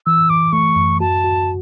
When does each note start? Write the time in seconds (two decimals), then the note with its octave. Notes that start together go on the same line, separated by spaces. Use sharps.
0.06 E3 E6
0.29 E3 D6
0.53 A3 C#6
0.76 F#2
1.00 F#4 A5
1.24 F#4